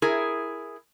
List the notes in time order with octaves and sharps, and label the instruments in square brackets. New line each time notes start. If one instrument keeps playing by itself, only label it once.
[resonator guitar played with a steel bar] E4 G#4 A#4